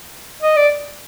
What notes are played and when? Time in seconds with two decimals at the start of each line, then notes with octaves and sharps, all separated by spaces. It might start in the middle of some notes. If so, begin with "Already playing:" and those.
0.42 D#5
0.56 D5